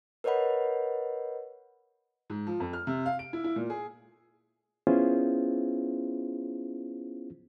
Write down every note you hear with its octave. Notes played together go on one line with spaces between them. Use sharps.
A#4 B4 C#5 D#5 F#5 B5
G#2
F3
F2
F6
C3
F5
D7
E4
E4
A#2
G#4
B3 C#4 E4 F4 G#4 C5